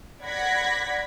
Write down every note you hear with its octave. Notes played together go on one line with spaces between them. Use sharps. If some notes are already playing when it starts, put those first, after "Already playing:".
D5 F#5 B5 G#6 A#6 B6